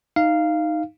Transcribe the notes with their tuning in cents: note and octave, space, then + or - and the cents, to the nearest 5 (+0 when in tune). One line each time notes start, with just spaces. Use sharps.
D#4 +0 F5 -10